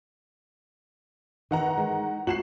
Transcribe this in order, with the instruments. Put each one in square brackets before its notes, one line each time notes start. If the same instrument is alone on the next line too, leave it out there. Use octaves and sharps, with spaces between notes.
[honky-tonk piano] D#3 F#5 A#5 [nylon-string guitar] E3 D#4
[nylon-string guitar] G#3
[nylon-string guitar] F#4 [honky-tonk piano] C7 E7 F#7